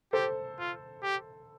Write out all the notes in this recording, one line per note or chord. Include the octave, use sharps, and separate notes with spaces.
G4 A4 C5
F4
G4